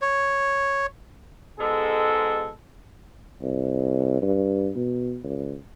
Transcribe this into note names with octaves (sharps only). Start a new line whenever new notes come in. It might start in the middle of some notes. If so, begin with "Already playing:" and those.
C#5
G#2 B2 G#3 A4
C2
G2
B2
C#2